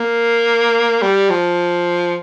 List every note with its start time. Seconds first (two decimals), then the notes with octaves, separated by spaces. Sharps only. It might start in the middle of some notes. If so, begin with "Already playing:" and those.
Already playing: A#3
1.02 G3
1.30 F3